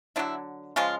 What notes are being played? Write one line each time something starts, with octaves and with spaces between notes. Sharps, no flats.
D3 F#3 B3 D4 E4
C#3 F3 G#3 F4